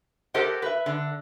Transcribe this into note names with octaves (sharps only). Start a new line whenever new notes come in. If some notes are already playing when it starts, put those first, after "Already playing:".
G4 A4 A#4 C5 D#5 F#5
B4 E5
D3